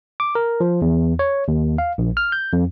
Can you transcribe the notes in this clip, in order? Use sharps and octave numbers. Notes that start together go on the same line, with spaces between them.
D6
A#4
F3
E2
C#5
D#2
F5
A#1
F6
G6
F2